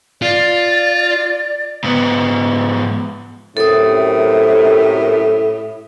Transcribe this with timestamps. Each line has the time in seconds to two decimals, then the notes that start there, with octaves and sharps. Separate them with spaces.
0.22 F4 D5
1.84 G#2 B3
3.57 F#2 A2 C3 A4 A#4 D#6